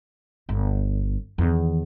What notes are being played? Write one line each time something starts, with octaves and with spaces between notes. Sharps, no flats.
G1
E2 D#3